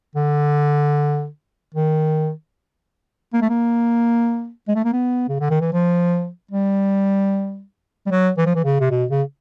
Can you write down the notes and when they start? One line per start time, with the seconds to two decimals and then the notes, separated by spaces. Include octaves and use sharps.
0.16 D3
1.74 D#3
3.33 A#3
3.42 A3
3.49 A#3
4.68 G#3
4.75 A3
4.84 A#3
4.93 B3
5.29 C#3
5.40 D3
5.50 D#3
5.61 E3
5.73 F3
6.51 G3
8.06 G3
8.11 F#3
8.37 E3
8.46 F3
8.55 E3
8.64 C#3
8.80 C3
8.91 B2
9.10 C#3